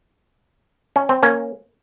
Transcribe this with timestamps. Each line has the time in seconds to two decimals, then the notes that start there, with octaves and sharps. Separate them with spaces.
0.96 C#4
1.09 C4
1.23 A#3 C#4